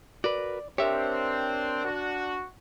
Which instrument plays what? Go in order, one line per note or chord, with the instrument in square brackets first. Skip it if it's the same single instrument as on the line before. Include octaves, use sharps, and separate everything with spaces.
[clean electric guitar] F#4 A#4 B4 [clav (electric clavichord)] D5
[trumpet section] C4 [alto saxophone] D4 [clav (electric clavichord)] G4 E5 [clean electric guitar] A#4 C#5
[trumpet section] F#4